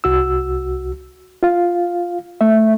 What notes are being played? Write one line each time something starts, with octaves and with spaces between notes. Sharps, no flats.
C2 F#4 E6
F4 F5
A3 E5